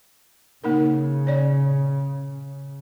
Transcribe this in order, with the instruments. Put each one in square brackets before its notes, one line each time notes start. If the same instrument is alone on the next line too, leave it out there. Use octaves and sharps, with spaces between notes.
[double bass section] C#3 [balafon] A#3 D#4 A#4
[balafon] C#5 D5